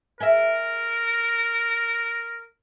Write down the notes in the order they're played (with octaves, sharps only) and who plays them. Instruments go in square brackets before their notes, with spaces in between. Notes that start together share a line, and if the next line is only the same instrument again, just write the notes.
[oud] G#4 E5 [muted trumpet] A#4